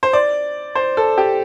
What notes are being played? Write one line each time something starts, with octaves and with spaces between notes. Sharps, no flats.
C5
D5
C5
A4
G4